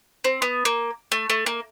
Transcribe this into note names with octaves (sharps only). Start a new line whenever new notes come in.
C4
B3
A#3
A3
A3
A#3